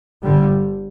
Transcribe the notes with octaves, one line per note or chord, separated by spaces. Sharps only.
G1 G2 D3 G3